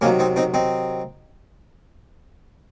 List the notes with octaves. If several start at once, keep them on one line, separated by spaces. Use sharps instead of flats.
C3 D#3 F#3 A#3 C#4
C4 D#4
C4 D#4
C4 D#4